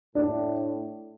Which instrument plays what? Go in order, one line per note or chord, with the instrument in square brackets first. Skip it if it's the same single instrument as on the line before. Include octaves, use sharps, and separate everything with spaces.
[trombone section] A2 [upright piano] D4